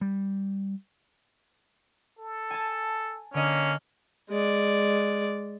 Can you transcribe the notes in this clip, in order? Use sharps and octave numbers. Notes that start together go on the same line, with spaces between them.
G3
A4
G#5 A5
D3 A#3 C#4 D#5
G#3 D5